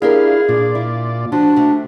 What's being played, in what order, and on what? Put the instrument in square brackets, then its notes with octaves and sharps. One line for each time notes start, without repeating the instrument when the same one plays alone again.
[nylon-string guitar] D4 G4 A#4 [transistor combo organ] E4 F5 [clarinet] G#4
[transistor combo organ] A#2 F4 D5 [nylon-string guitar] D4
[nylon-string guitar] E4
[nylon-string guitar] F3 [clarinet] D4 [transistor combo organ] F#4
[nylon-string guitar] C3 A3